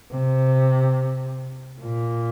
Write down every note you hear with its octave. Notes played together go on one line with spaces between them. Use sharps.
C3
A#2